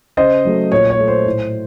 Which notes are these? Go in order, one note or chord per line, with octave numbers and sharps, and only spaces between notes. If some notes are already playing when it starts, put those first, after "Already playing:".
C#3 C5 D#5
F#3 A3
A#2 C#5
C#5
A3
C5
A2